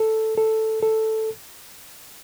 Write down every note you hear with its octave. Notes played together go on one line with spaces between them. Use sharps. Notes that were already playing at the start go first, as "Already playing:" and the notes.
Already playing: A4
A4
A4